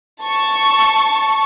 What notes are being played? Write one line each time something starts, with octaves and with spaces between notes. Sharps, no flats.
A5 C#6